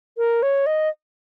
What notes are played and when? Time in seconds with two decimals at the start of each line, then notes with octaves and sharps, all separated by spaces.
0.18 A#4
0.43 C#5
0.66 D#5